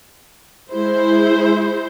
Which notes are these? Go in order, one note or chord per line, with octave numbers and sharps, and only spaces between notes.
G#3 E4 C5